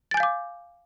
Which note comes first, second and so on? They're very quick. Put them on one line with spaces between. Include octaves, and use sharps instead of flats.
A6 G#5 G6 F5 D6